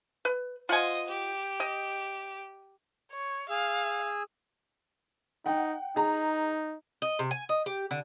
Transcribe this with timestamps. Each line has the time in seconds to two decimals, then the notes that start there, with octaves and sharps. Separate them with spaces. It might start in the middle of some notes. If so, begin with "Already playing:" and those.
0.25 B4
0.69 F4 C5 D#5 F#5 G#5
1.07 G4
1.60 D#5
3.12 C#5
3.50 G#4 F5 E6
5.46 D#4 F#5 G5
5.96 D#4 G#4 A#5
7.02 D#5
7.19 C3
7.31 G#5
7.49 D#5
7.66 G4
7.91 D3